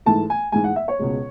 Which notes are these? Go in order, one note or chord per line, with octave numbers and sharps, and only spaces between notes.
G#2 E3 A3 A5
G#5
G#2 E3 G#3 G#5
F#5
E5
C#5
C#2 B2 G#3